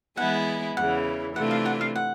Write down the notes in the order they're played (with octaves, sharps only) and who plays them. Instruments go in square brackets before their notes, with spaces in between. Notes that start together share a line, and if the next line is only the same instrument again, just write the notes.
[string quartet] E3 G#3 B3 E4 G#4 [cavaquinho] F#5
[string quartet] E2 C#3 E3 [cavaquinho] F#5
[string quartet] C3 E3 A3 D4 F4 [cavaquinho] F#5
[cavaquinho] F5
F#5
F5
F#5